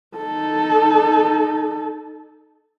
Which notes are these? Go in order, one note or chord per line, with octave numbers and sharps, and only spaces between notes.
D#4 A4